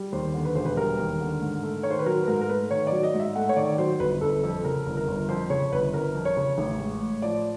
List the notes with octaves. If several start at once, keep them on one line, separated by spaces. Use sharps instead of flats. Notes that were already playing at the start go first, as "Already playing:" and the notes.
Already playing: G3
D#2 C5
D3
B4
E1 C5
B4
G3 A#4
D#2
D3
G#2
A3
D#3 C#5
C5
B4
F#3 A#4
B4
G#2 A#4
A#4
A3 B4
D#3 C#5
D5
F#3
D#5
G#2
E5
A3 F#5
C#5
D#3 D5
F#3 C5
G1 B4
G1 A4
F2 A4
C#3 A#4
G1
A#4
G1
F2 C5
C#3 C#5
G1 B4
G1 A#4
F2
C#5
C#3
A1
G#3
A2
F3 D5